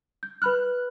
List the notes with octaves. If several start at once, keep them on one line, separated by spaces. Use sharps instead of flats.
G6
B4 B5 F6 F#6